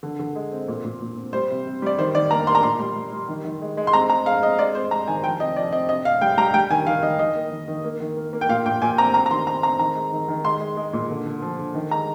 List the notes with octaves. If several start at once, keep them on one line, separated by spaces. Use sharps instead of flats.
D3
D3
G#3
C4
A#2
A#2
A#2
C4
G3 C5
C3
C3
G3 D5
D#3 C5
D#3 D5
A#3 A#5
A#3 C6
A#5
A#2 C6
G3
G3
G3
D#3
D#3
G#3
G#3
C6
C4 A#5
G#3 A#5
G#3 F5
C4 D#5
G#3 D5
C4 C5
G#3 A#5
D#3 G#5
F3 G5
C3 D#5
F3 D5
C4 D#5
C3 D#5
C3 F5
G3 G5
G3 A#5
G3 G5
D#3 G#5
D#3 F5
D#3 D#5
D#3 D#5
A#3
D#3
D#3
A#3
D#3
A#3
A#3
G5
A#2 F5
A#2 G5
A#2 G#5
C4 A#5
C4 A#5
A#5
D#3 C6
C4 A#5
C4 A#5
D#3 A#5
G#3
D#3
D#3
G#3 C6
G#3
G#3
A#2
D3
D3
F3
D3
D#3
G#3 A#5